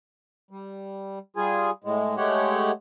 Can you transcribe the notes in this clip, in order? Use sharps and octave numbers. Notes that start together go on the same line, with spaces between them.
G3
G3 F4 G#4 G#5
A2 G#3
G#3 A3 G4 C#5 F#5